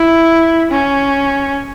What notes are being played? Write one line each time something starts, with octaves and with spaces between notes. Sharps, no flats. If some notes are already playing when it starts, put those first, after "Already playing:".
Already playing: E4
C#4